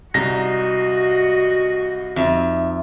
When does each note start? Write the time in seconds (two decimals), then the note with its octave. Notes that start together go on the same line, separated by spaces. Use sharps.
0.14 C2 D#4 F#4 D#5 A#6
2.16 F2 D#4 E5